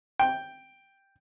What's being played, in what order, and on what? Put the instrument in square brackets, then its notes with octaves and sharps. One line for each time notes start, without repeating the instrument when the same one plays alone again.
[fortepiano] G5